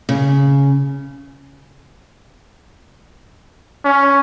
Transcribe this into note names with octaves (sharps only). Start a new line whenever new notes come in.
C#3
C#4